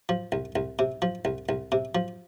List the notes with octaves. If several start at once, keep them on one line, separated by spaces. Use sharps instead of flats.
F3
C2
C2
C3
F3
C2
C2
C3
F3